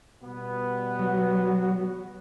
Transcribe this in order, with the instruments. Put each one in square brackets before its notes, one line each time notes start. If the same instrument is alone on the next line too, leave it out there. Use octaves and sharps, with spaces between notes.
[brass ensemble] B2 G3 B3
[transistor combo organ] F#3